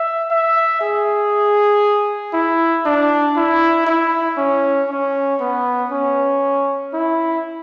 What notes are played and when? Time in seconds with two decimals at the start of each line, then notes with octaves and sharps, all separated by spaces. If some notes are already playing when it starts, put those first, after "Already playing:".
Already playing: E5
0.30 E5
0.81 G#4
2.33 E4
2.86 D4
3.37 E4
3.86 E4
4.38 C#4
4.89 C#4
5.40 B3
5.92 C#4
6.93 E4